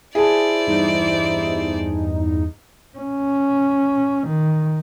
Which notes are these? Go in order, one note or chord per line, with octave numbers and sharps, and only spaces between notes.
E4 G#4 C5 D5 A5
E2 G2 D#4
C#4
D#3